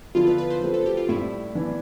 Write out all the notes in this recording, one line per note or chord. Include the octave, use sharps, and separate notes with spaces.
D3 F3 B3 E4 F4
B4
B4
C5
F3 A3 C4 B4
A4
G4
F4
A2 G3 D4 E4
E3 B3 D4